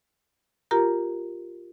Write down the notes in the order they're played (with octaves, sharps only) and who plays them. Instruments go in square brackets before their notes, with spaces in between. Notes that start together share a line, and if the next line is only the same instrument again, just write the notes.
[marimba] F4 G4 A#4 A#5